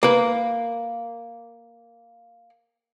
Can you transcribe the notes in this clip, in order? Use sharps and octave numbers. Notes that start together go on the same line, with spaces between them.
A#3 B4